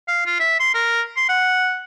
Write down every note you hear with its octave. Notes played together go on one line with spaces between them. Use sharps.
F5
F4
E5
C6
A#4
C6
F#5